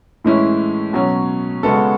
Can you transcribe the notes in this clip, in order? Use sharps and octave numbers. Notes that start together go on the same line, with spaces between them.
A2 E3 G#3 C#4 E4
B2 F#3 C#4
C#3 G#3 B3 F#4 A4